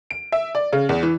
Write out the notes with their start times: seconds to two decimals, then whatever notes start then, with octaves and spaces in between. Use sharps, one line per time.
0.11 D7
0.32 E5
0.55 D5
0.73 C#3
0.89 E2
1.03 E3